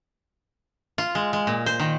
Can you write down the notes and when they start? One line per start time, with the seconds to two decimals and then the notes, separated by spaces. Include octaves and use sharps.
0.98 F4
1.15 G#3
1.33 G#3
1.47 A#2
1.66 C5
1.80 D#3